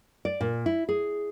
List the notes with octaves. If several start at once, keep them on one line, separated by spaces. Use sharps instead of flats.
D5
A#2
E4
G#4